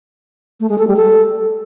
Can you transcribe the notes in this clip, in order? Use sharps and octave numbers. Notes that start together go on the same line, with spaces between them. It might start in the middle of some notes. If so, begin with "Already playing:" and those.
A3
G#3
A4
G3
A4